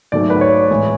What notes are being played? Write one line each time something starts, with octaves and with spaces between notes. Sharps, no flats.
G#2 F#3 A3 D5
B4
C#5
A2 E3 G#3